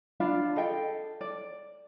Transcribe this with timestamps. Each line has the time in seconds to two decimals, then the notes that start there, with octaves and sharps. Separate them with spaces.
0.20 D4 F4 F5 B5
0.56 G#4 A4 D#5 G5
1.21 D5